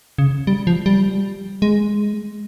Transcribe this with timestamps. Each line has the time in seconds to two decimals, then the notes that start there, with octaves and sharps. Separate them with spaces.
0.18 C#3
0.47 G3
0.67 F3
0.86 G3
1.62 G#3